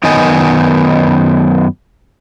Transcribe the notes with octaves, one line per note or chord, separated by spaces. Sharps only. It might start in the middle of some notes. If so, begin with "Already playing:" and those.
F#2 D#3 B3 D#4 D#5 G#5